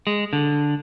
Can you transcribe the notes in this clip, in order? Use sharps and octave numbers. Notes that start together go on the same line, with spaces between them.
G#3
D3